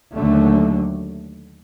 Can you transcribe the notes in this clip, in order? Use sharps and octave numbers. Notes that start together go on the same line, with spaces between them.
D#2 D3 F#3 A3